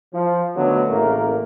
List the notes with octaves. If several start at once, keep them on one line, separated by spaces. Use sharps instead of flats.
F3
D3 D#3 F#3 A3 B3
A1 C#3 A3 A#3 A#4